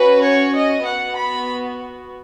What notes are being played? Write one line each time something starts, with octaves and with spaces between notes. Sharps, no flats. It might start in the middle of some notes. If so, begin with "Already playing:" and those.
Already playing: C#4 F#4 B4
C#5
D#5
B3 F#4 F#5
B5